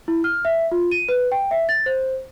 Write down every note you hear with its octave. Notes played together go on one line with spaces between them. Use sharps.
E4
F6
E5
F4
D#7
B4
G5
E5
A6
C5